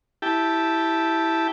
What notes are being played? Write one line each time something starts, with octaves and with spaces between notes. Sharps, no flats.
E4 G4 G5 A5